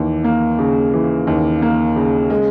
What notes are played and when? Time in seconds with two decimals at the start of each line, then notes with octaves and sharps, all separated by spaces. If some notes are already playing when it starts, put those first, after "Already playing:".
Already playing: D#2 E3
0.24 A#3
0.59 C#3
0.93 E3
1.27 D#2
1.62 A#3
1.96 C#3
2.30 G#3